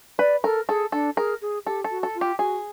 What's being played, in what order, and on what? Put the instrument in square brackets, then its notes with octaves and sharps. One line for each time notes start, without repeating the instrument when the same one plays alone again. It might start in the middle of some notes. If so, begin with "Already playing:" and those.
[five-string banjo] B4 [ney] D5
[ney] A4 [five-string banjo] A#4
[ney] G#4 [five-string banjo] A4
[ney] D4 [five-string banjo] A4
[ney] G#4 [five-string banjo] A#4
[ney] G#4
[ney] G4 [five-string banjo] A4
[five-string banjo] A4
[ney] F#4
[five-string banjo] A4
[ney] F4
[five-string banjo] G4
[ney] F#4 [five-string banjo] G#4